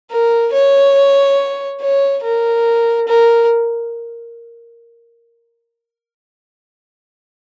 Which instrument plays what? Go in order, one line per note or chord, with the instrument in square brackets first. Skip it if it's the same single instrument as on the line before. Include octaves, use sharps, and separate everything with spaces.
[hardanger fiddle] A#4
C#5
C#5
A#4
A#4